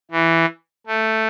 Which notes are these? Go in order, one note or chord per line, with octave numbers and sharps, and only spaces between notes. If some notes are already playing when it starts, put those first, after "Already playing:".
E3
A3